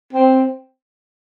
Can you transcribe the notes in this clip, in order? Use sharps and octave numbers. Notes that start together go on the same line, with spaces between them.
C4